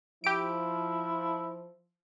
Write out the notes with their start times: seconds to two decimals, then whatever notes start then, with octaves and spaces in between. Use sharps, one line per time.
0.24 F3 E4 G4 D7